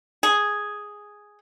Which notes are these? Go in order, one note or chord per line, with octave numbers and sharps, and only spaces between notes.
G#4